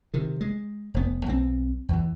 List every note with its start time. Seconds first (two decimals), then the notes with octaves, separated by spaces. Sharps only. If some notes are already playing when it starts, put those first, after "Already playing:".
0.14 C3 D#3
0.41 G#3
0.94 F1 B3
1.26 B1 F3 C4
1.89 E2 E3